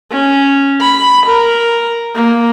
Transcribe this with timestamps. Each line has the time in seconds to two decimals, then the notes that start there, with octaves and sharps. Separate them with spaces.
0.12 C#4
0.81 B5
1.26 A#4
2.15 A#3